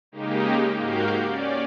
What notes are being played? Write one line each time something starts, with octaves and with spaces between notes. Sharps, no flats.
C#3 G#3 A#3 D#4 G4
G#2 A#3 F#4 G4 F5 G6
C#4 D5